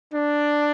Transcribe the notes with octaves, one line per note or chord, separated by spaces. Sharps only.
D4